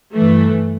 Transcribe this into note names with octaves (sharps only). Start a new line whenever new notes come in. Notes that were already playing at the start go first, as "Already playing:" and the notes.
G2 E3 A3